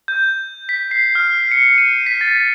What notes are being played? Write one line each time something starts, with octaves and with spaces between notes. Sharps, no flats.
G6
B6
C7
F6
C#7
D#7
B6
A6